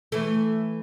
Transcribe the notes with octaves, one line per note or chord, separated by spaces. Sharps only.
E3 A3